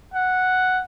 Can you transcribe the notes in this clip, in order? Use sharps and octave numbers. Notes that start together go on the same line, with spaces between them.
F#5